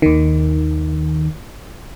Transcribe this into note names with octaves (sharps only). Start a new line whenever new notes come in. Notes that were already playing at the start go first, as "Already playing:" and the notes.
D#2 D#3